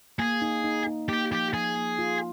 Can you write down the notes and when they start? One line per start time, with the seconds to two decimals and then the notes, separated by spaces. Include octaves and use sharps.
0.19 A#3 G#4
0.42 D#4
0.64 D#4
0.87 D#4
1.09 A#3 G4
1.31 F3 G4
1.53 F3 G#4
1.76 A#3
1.99 F4